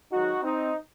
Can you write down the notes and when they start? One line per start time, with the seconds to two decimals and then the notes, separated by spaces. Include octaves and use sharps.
0.11 G#2 D#3 F#3 D#4 F#4
0.42 C4 D#4